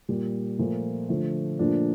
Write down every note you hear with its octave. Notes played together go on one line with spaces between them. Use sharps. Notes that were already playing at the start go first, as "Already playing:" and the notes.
A#2 G3
A#2 F3 A3
D3 F3 A3
A#2 F3 A3 D4